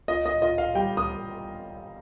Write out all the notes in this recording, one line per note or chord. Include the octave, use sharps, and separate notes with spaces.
F4 D#5
D#5
F4 D#5
F5
G3 G5
D#6